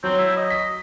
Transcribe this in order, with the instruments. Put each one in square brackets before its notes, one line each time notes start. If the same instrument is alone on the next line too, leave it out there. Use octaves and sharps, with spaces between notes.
[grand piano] F#3 [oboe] C4
[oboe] E4
D#5
[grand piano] B6